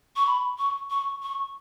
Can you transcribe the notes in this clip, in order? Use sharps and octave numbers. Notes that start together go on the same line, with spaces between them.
C#6
B5
C#6
C#6
C#6